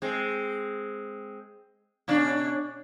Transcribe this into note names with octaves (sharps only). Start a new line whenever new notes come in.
G#3 C4
B2 C#4 D4